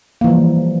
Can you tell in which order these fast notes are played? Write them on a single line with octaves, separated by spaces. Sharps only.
A#3 E3 F3 G3